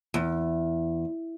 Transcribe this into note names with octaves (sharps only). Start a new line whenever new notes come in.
E2